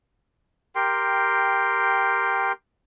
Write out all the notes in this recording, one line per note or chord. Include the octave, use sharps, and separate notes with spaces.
G4 A#4 G5 C6